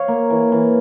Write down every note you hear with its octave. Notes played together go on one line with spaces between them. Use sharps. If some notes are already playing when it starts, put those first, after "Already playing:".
Already playing: C#5 F5
A#3
E3
E3